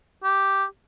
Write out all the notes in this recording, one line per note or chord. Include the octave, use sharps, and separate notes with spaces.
G4